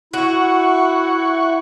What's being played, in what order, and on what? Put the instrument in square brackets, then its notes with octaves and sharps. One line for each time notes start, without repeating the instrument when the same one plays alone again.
[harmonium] E4 [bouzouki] F#4 [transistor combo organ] F#5 C#6